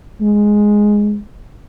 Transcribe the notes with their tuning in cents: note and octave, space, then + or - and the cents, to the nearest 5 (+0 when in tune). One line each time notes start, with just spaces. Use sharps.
G#3 +0